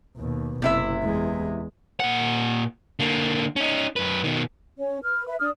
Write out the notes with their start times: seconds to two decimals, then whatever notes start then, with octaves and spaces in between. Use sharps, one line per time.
0.17 D#2 B2
0.62 F#1 C3 E4 E5
1.03 E2 G#3
2.00 A#2 F#5
2.99 D3 A#3
3.56 C#4 D#4
3.96 F#2 B4
4.24 B2 D#3
4.78 C#4 C#5
5.03 B4 F6
5.26 B4 E5
5.40 D4 D5 D#6 F6